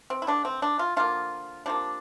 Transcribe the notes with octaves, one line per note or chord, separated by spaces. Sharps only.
C4
E4
D3 A3 D4
C4
D4
F4
D3 F3 A#3 F4
C3 F3 A#3 D4